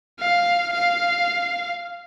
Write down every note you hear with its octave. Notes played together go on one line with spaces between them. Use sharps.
F5
F5